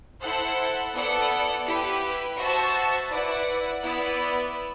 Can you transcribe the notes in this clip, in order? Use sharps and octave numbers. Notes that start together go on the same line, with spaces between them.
E4 A4 C5 F#5
B3 E4 A4 D5 F#5
E4 G4 B4
F#4 C5 E5 A5
E4 B4 D5 F#5
B3 E4 B4 D5